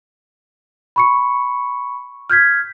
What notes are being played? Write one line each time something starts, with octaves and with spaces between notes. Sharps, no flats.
B5 C#6 C#7
F6 G6 G#6 B6